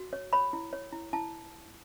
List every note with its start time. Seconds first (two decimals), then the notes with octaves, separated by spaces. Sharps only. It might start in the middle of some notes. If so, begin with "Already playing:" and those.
Already playing: F#4
0.13 C#5
0.33 C#5 B5
0.53 E4
0.73 C#5
0.93 E4
1.13 E4 A5